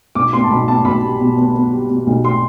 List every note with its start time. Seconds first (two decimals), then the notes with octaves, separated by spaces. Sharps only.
0.15 B1 D6
0.33 B3 C6
0.44 A5
0.51 B1 B5
0.68 B3 A5
0.85 B1 B5
1.03 G3
1.20 B2
1.38 B3
1.55 B3
1.72 G3
1.90 B2
2.07 B1
2.25 C6